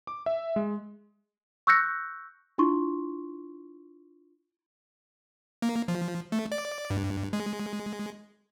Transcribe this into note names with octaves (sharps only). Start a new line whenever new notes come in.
D6
E5
G#3
C#6 E6 F#6 G6 A#6 C#7
D4 E4 F4 C6 C#6
A#3
F3
A3
D5
G2
G#3